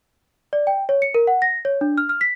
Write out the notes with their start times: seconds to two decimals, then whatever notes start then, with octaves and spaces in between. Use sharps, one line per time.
0.53 D5
0.67 G5
0.89 C#5
1.02 C#7
1.15 A#4
1.27 F#5
1.42 A#6
1.65 C#5
1.81 D4
1.98 F6
2.09 F6
2.21 B6